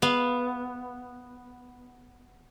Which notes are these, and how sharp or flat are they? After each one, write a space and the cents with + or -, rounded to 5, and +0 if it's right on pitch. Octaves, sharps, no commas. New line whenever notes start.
B3 +0 F5 +0